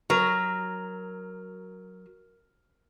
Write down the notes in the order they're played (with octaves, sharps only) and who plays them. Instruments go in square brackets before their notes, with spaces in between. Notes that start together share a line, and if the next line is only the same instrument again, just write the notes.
[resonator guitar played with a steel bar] F#3 [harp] A#4